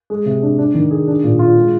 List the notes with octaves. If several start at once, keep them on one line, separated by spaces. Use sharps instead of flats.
G#3
C3
D4
D4
D#3
G#4
D4
A#2
F4
G#3